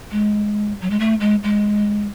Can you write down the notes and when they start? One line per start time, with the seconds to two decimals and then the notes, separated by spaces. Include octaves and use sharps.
0.12 G#3
0.81 F#3
0.90 G#3
1.00 A3
1.21 G#3
1.43 G#3